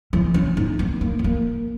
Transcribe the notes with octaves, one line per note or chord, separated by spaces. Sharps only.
E3
C#4
D#4
B3
A#3
B3
A#3